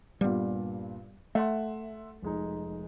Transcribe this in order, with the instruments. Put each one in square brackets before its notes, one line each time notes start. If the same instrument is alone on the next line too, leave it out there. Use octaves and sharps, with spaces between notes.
[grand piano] G2 A#2 [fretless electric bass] G3 B3
[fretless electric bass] A3 [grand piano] E5 F#5 C6
[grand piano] F1 G#3 D#4